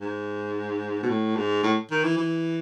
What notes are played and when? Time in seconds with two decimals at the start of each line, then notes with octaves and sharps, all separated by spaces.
0.01 G#2
1.03 B2
1.09 A2
1.36 G#2
1.63 A2
1.90 D#3
2.04 E3
2.17 E3